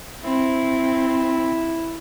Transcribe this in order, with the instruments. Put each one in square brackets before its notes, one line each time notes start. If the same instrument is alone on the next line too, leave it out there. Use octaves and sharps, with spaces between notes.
[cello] C4 [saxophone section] E4